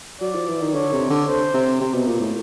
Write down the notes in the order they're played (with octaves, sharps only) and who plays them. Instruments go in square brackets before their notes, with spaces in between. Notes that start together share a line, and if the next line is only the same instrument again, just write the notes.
[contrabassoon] F#3 [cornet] D5
[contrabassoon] F3
E3
D#3
[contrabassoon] D3 [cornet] C#5
[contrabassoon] C3
D3
[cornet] C5
[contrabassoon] C3
C3
B2
A#2
A2